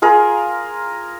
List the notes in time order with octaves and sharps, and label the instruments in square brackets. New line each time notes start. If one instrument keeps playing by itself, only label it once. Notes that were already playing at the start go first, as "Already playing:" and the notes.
[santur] F4 G#4 A#4